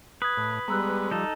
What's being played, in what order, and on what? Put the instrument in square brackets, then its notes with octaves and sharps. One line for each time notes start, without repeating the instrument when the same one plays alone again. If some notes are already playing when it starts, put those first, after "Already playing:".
[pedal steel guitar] B4 [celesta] D#6 G#6
[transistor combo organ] A2
[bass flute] G3 [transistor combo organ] G#3 B3 [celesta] A#5 E6 F#6
[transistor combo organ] F3 [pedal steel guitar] D#4 A4